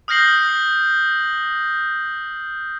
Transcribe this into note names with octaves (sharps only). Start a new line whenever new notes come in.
D#6 F6 G6 A#6 C7 F#7